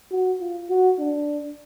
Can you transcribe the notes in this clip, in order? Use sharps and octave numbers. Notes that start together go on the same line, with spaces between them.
F#4
F4
F#4
D4